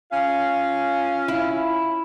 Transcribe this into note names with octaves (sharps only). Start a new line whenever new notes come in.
C#4 F4 F5
E4